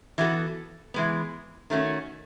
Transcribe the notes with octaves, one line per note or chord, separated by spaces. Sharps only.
E3 B3 F#4 A4
E3 G#3 B3
D#3 A3 C#4 F#4